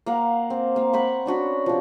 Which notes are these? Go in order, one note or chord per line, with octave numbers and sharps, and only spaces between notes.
A#3 F5 F#5
C4
A#3 F5
F#5 G5 B5 C#6
C#4 D4 F#4 B5
C3 F3